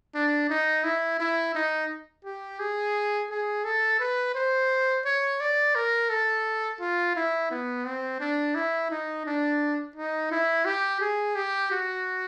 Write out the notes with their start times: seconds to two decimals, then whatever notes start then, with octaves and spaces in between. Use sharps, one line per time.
0.14 D4
0.50 D#4
0.84 E4
1.20 E4
1.55 D#4
2.25 G4
2.60 G#4
3.30 G#4
3.64 A4
4.00 B4
4.35 C5
5.05 C#5
5.40 D5
5.75 A#4
6.10 A4
6.80 F4
7.16 E4
7.51 B3
7.85 C4
8.20 D4
8.55 E4
8.91 D#4
9.26 D4
9.96 D#4
10.31 E4
10.65 G4
11.01 G#4
11.35 G4
11.71 F#4